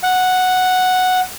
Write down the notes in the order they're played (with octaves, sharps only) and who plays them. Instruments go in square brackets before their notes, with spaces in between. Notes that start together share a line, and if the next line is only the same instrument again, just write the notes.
[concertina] F#5